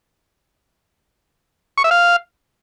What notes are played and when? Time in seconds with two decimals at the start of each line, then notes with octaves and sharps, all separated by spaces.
1.78 C#6
1.84 E5
1.91 F5